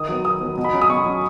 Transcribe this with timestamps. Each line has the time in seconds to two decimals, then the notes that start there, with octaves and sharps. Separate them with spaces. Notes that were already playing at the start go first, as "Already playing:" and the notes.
Already playing: D#3 D#6
0.08 F#3 B3
0.24 D#3 D#6
0.41 F#3 B3
0.57 B2
0.64 B5
0.73 F#3 C#4
0.81 D#6
0.90 B2 C#6
1.05 F#3 C#4